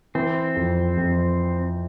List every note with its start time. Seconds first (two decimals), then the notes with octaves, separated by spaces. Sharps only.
0.15 E3 C4
0.56 F2
0.97 F2